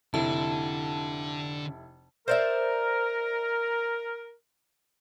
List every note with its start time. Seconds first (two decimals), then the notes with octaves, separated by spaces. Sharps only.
0.14 F1 D3 E4 A5
2.28 A#4 C5 D5 E5